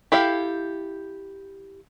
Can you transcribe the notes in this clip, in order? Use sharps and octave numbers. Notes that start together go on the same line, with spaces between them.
E4 G4 A4 F5